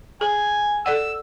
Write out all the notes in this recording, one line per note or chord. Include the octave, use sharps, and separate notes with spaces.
G#4 G#5
A4 D5 F#5 E6